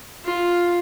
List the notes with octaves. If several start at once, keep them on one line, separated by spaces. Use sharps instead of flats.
F4